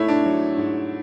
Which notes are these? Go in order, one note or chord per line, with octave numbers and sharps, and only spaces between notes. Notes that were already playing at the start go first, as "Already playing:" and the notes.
Already playing: G#2 A3 E4 C#5
D4
F#3
G#2